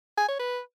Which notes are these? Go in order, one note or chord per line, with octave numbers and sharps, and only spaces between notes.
G#5
C#5
B4